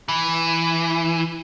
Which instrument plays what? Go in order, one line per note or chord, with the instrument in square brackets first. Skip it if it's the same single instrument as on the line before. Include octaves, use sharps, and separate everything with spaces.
[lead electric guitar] E3